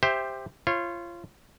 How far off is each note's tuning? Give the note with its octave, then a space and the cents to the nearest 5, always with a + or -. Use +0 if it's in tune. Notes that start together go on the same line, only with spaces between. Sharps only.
G4 +10 C5 +0 E5 +0
F4 -25 C#5 -35